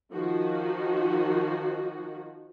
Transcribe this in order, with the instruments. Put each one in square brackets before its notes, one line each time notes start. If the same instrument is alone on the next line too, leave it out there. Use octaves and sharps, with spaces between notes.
[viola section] D#3 F3 F#4